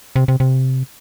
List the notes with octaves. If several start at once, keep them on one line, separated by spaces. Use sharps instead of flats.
C3
C3
C3